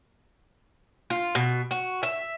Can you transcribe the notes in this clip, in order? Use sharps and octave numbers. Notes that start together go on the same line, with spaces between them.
F4
B2
F#4
E5